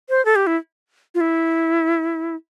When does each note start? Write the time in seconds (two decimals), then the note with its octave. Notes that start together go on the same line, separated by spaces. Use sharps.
0.09 C5
0.25 A4
0.36 G4
0.47 E4
1.15 F4
1.21 E4